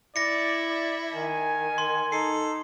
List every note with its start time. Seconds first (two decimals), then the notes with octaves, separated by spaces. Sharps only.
0.16 E4 D5 A#6 C#7
0.70 D5
1.12 D#3 G#5
1.78 C6
2.12 D#4 A4 C7